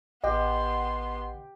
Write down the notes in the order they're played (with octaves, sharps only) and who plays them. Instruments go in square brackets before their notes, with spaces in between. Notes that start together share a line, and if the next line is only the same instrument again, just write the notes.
[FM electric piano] A1 F#5 [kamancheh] B3 C6 [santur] G4 [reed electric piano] D#5